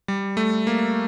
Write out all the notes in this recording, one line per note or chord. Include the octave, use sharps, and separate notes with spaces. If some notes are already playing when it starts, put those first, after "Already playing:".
G3
A3
A#3